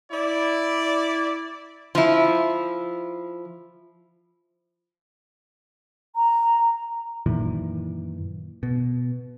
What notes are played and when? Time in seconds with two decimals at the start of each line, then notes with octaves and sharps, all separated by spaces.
0.11 E4 D5
1.95 F3 E4
6.16 A#5
7.26 F#2 A#2 D#3 E3
8.63 B2